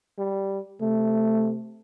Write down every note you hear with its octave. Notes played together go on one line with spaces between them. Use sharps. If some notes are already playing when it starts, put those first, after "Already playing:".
G3
C3 A3